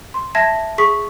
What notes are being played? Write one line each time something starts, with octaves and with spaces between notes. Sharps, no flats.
C6
E5 A5 G#6 A#6
G#4 C#6 B6